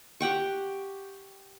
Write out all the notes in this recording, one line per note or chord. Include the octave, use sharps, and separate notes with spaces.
G4 F#5 G5 C#6